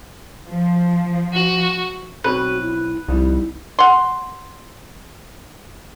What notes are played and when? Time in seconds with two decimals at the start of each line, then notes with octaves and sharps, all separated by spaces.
0.48 F3
1.33 F#4
2.24 B1 C4 F#4 B4 C#5
2.60 E4
3.08 C2 F3 G3 D#4 E4
3.79 F#5 C6